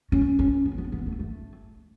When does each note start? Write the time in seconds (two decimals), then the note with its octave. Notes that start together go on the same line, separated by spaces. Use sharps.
0.12 C#4
0.39 C#4
0.65 B3
0.78 B3
0.92 B3
1.06 A3
1.19 A3